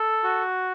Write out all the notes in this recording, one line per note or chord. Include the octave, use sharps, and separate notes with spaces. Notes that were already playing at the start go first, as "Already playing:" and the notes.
Already playing: A4
F#4